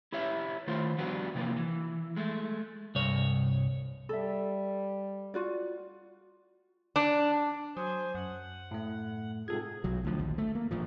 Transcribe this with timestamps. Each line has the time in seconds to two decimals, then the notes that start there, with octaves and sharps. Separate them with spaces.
0.12 E4 G4 C#5 E5
0.67 D#3 A3 F4 C5
0.98 F3 G3 B3 D4 F#4
1.35 C3 E3 F3 A#3
1.56 E3
2.16 G#3 A3
2.95 C2 G2 C#5
4.09 G3 A4 E5
5.34 F4 F#4 D5
6.96 D4
7.77 F#3 C5 G#5 D#6
8.15 F#2 F#5
8.71 A2 A3
9.48 G#2 C3 F4 G#4 A4 G#6
9.84 B1 F#3
10.05 D2 F3
10.19 A#1 D#2
10.38 A3
10.55 A#3
10.71 A1 A#2 F3